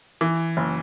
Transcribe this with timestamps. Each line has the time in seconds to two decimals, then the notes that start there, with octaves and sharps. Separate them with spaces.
0.21 E3
0.57 F#1